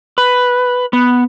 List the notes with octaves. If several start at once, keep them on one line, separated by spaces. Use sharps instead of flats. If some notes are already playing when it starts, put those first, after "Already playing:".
B4
B3